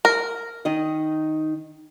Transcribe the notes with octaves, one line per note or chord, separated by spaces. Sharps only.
A#4
D#3 D#4 D#5